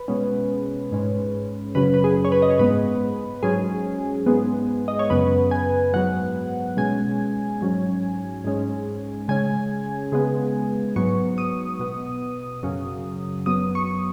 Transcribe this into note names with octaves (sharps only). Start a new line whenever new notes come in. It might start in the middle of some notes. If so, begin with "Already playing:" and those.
Already playing: B4
B2 G#3 C#4
G#2 G#3 C#4
F#2 C#3 F#3 C#4 B4
B4
G#4
C#5
B4
D#5
C#5
G#2 G#3 B3 B4
G#2 F#3 C#4 G#4
G#2 G#3 B3
D#5
C#5
F#2 C#3 B3 B4
G#5
G#2 F#3 B3 F#5
B2 G#3 C#4 G#5
G#2 F#3 C#4
G#2 G#3 C#4
C#3 G#3 C#4 G#5
C#3 G#3 B3
G#2 F#3 B3 C#6
D#6
B2 B3
F#2 C#3 F#3
F#2 F#3 B3 D#6
C#6